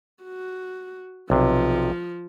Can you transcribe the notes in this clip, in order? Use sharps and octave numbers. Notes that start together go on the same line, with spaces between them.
F#4
B1 C3 F3